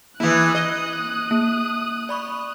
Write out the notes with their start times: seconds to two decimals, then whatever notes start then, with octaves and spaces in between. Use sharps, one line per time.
0.20 E3 A#3 E4 D#6 F#6
0.55 D#5
1.31 A#3
2.09 D5 B5 C#6